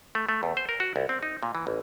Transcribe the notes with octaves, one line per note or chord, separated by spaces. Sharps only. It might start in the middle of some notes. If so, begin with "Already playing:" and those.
A3
A3
E2
C5
A#4
F#4
C2
C4
D#4
A#2
E3
A1